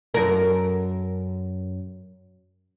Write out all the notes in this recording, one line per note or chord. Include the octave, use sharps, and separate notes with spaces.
F#2 A#4